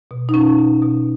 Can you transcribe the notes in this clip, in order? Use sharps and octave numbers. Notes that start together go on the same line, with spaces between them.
B2
D#4
B2 C#4
B2
B2